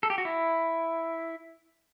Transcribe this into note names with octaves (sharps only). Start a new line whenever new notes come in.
A4
G4
F#4
E4